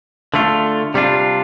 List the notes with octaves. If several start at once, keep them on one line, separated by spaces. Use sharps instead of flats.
D3 A3 D4 F4
C3 G3 D4 F4